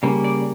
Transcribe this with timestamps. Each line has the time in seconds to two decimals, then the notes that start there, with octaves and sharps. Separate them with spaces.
0.03 C#3 G3 A#3
0.24 D5